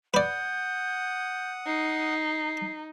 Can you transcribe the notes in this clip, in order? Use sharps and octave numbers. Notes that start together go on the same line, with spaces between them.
B4 D5 F#5 D#6 G6
D#4 C7